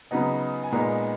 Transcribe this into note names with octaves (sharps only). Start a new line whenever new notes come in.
C#3 F#3 B3 D#4 A#5
G#5
A#2 G#3 B3 D#4 A#5